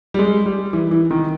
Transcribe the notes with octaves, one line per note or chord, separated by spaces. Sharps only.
G3
G#3
G3
E3
E3
D#3